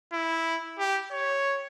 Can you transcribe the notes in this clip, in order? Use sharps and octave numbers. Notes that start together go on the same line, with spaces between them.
E4
G4
C#5